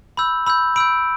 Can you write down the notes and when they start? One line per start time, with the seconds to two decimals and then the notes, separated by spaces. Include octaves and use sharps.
0.17 B5 E6 G6
0.47 B5 E6 G6
0.76 B5 E6 G6 D7